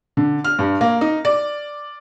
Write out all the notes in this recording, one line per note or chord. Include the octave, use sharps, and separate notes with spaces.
D3
F6
G2
A#3
D#4
D5